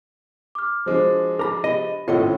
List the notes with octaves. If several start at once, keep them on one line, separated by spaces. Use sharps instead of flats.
D6 F6
F3 G#3 D4 F#4 C5 D6
A#4 A#5 B5 D6
G4 D#5 B5 D#7
G#1 A2 C#4 F4 A4 D#5